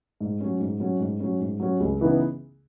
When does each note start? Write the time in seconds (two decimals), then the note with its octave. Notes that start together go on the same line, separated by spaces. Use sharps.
0.20 G#2
0.41 F#3 C#4
0.60 G#2
0.80 F#3 C#4
1.00 G#2
1.20 F#3 C#4
1.40 G#2
1.60 F#3 C#4
1.80 C#2
2.00 C#3 E3 B3 D#4